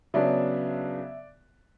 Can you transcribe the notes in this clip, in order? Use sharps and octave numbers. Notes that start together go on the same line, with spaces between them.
C#3 F#3 B3 D4 D5 E5